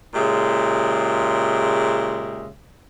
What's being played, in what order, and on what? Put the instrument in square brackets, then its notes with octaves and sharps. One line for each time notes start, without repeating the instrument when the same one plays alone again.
[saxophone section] A#2 C#3 G#3 G4 E5